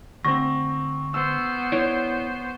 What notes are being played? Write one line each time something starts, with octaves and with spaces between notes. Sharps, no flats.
D2 C4 C#6 A#6
B3 C5 E6
E4 C#5 D5